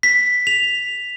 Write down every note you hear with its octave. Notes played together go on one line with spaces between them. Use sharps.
B6
F7